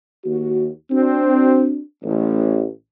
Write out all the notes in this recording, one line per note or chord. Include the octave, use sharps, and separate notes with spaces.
D#2 F#4
C4 D4 F#4
A1